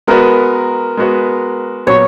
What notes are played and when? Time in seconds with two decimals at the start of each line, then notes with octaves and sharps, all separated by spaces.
0.07 G#3 B3 F#4 A#4 B4
0.97 G#3 B3 F#4 B4
1.87 A#2 F#3 B3 C#5